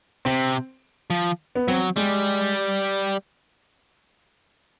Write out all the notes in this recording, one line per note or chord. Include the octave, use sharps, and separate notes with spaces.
C3 C4
F3
B3
F#3 C4
G3 G#3